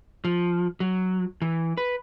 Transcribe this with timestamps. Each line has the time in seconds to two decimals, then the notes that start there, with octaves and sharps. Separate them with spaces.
0.25 F3
0.80 F#3
1.42 E3
1.77 B4